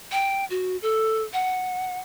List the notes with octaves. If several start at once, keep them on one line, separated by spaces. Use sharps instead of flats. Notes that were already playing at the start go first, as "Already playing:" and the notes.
G5
F#4
A4
F#5